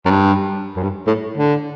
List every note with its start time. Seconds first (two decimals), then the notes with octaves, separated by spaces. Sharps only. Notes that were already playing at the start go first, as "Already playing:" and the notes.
0.05 F#2
0.10 G2
0.76 F#2
0.83 G2
1.07 A2
1.37 D3